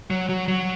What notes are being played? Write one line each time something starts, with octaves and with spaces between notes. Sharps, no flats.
F#3
F#3
F#3